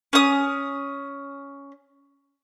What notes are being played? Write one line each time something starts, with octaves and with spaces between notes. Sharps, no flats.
C#4 D#6